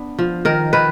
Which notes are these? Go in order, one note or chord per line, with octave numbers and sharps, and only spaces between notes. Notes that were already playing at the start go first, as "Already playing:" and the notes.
Already playing: B3 D4
F3
D#3 A#4
D#3 B4